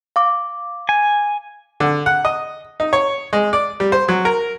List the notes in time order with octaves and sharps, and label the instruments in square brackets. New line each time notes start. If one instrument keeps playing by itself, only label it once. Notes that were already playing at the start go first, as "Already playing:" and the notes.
[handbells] F5 D6
[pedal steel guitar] G#5
[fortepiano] D3
F#5
D#5
D#4
C#5
G#3
D5
G3
C5
F#3
A#4